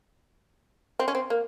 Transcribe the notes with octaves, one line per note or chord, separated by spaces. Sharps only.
C4
C#4
C4
A#3